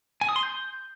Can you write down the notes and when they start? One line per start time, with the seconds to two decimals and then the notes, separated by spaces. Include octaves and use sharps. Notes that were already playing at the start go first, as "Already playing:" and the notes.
0.21 G#5
0.29 D#6
0.36 C6
0.43 G6